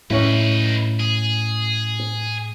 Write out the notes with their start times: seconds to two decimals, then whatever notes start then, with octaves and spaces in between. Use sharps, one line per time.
0.10 A2 C#4 D#4 E4 B4
1.00 G#4